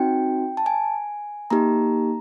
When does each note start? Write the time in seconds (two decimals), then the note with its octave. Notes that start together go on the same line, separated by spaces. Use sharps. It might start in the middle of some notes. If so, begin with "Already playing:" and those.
Already playing: C4 D#4 F#4 G5
0.57 A5
0.66 G#5
1.50 A#3 D#4 G4 A#5